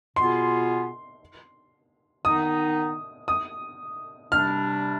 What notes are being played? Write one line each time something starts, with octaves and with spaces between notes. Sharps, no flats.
B2 B3 F4 G#4 C6
D#3 B3 D#4 D#6
D#6
C3 G3 D4 F6